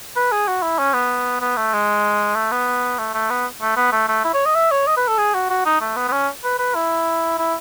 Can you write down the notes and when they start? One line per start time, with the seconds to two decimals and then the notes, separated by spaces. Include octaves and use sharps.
0.16 B4
0.32 G#4
0.48 F#4
0.62 E4
0.79 C#4
0.94 B3
1.41 B3
1.57 A3
1.73 G#3
2.35 A3
2.51 B3
2.98 A3
3.14 A3
3.30 B3
3.62 A3
3.77 B3
3.92 A3
4.09 A3
4.25 E4
4.34 C#5
4.46 D#5
4.55 E5
4.71 C#5
4.87 D#5
4.97 B4
5.08 A4
5.18 G#4
5.34 F#4
5.50 F#4
5.65 D#4
5.81 A3
5.96 B3
6.08 B3
6.12 C#4
6.44 B4
6.59 B4
6.75 E4
7.38 E4